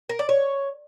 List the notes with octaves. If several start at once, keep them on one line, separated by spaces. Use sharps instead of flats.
A#4
D5
C#5